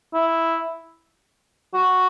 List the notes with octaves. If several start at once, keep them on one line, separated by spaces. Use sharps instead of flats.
E4
F#4